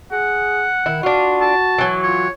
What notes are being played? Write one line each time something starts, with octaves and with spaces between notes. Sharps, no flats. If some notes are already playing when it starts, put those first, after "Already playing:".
G#4 F#5
D#3 E4
D4 F4 F#4
A5
E3 F#3
F4 C#5